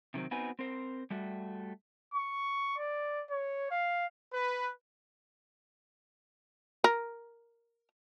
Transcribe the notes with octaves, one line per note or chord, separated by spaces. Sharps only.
C3 D#3 F#3 C4
B3 C4 D#4 F#4 B4 G#5
C4 A#4 C5
G3 A3 F#4
C#6
D5
C#5
F5
B4
A#4